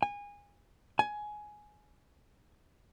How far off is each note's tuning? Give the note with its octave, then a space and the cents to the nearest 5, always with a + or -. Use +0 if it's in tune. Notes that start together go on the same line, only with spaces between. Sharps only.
G#5 -25
G#5 +15